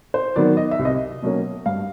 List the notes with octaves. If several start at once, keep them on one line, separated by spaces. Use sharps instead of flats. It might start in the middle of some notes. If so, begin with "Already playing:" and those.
C5
D#3 F#3 B3 D5
D#5
E5
C2
D#5
B2 F#3 A#3 C#4
G2 F5